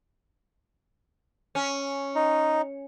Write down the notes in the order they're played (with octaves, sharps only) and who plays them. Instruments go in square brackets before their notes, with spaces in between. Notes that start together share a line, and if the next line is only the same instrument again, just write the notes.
[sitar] C#4
[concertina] D#4